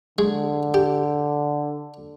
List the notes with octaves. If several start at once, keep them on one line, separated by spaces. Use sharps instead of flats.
D3 G#3
G4